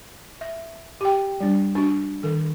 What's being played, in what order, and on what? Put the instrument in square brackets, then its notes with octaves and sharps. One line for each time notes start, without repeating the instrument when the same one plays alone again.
[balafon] E5
G4 G5
G3 D4
D4 F#4
D#3 A4